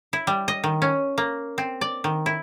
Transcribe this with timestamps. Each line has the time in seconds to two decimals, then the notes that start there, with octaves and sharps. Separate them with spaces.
0.13 E4
0.27 G3
0.48 D#5
0.64 D#3
0.82 C#4
1.18 A#3
1.58 C4
1.81 D5
2.04 D#3
2.26 E4